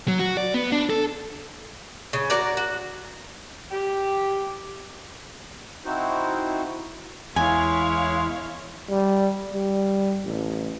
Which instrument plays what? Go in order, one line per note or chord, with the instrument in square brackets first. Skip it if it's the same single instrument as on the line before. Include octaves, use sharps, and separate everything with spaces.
[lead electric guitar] F#3
F#4
D5
B3
D4
A4
[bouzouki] C#3
F#4 A#4 D5
F#4
[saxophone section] G4
[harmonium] C4 D#4 E4 F#4 C5
[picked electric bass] E2 [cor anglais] G#3 [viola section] E4 C#5 F5 [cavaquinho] G#5
[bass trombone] G3
G3
A1